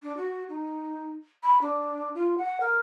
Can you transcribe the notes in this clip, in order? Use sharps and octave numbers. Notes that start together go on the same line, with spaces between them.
D4
F#4
D#4
B5
D4
F4
F#5
A#4